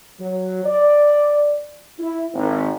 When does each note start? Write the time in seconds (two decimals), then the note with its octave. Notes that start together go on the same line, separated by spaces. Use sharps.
0.20 F#3
0.65 D5
1.99 E4
2.34 G#1